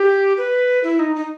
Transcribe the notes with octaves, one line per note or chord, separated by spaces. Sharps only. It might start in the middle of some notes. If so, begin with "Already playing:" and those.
Already playing: G4
B4
E4
D#4
D#4